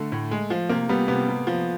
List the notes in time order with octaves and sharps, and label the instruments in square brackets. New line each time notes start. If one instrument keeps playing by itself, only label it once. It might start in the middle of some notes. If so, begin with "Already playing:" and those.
Already playing: [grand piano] D3 [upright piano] A3
[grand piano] A2
G#3
F3
[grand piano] C3 [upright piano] A#3
[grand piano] G3 [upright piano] B3
[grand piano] C3 [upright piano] B3
[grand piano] C3
F3